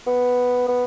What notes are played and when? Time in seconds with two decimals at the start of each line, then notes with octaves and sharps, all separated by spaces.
0.07 B3
0.68 B3